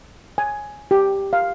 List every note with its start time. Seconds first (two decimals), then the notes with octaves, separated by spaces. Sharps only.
0.38 G#5
0.91 G4
1.33 F5